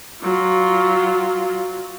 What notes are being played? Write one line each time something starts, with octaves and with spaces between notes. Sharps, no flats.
F#3 F4